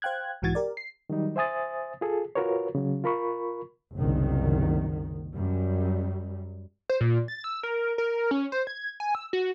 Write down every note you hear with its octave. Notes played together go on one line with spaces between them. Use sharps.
C5 F5 G5 F#6 G#6
B1 G#2 E3 F#4 G#6 A6
G4 A#4 D5
C7
D#3 F#3 G3 D#4
C5 E5 G#5 D#6 A6
F4 G#4 A4
F4 F#4 A#4 B4 C#5
C#3 F#3
F4 A#4 B5 C#6
F#1 C2 D#3
F#2 G3
C5
A#2
A6
E6
A#4
A#4
C#4
C5
G#6
G#5
E6
F#4